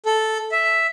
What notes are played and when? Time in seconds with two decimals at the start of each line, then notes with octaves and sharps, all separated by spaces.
0.06 A4
0.52 E5